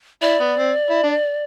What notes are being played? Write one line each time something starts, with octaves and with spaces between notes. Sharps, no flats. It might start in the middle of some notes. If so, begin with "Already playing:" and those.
E4 D5
B3
C4
E4
D4